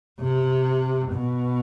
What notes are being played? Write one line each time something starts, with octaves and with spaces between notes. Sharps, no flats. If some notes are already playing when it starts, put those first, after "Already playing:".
C3
B2